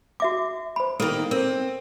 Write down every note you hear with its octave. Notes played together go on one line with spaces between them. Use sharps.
F#4 E5 D6
C5 B5
D#3 A#3 A4
C4 A#4